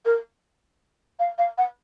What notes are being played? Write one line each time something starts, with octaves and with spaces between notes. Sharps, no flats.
A#4
F5
F5
F#5